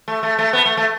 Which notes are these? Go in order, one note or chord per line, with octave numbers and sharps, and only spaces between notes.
A3
A3
A3
B3
A3
A3